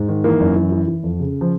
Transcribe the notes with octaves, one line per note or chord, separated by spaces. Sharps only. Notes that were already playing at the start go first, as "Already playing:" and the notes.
Already playing: G#2
D#3
E3 A#3
F#2
E3
E3
E3
F2
C#3
F3